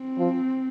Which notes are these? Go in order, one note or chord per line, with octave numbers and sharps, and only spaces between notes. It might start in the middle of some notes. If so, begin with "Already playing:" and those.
Already playing: C4
F3